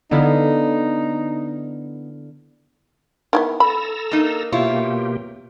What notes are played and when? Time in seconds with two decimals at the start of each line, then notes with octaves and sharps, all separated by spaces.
0.11 D3 B3 D#4 E4 F5
3.33 D#3 E3 B3
3.60 A4 A#5 B5 E6
4.11 A#3 D#4
4.52 B2 A#3 E4 F4 G4 C#5